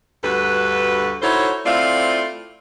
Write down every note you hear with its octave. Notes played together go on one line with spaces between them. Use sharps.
D2 G2 F#4 A4 B4
D#4 E4 F#4 A4 C5 C#5
A3 C4 E4 F4 D5 F5